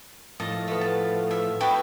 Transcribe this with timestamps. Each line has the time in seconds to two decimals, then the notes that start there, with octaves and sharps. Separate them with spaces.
0.40 A2 F3 D#5 A5
0.67 A3 B3
0.81 A5
1.31 E5
1.60 B3 E4 F#4 A4 G5 B5